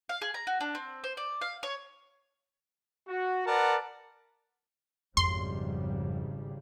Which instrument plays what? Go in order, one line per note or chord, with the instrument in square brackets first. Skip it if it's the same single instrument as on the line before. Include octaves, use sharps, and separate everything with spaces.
[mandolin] F5
G#4
A#5
F#4
D4
C4
C5
D5
F5
C#5
[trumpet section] F#4
A#4 B4 D5 F#5 A5
[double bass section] G#1 C#3 G3 [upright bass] F2 [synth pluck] C6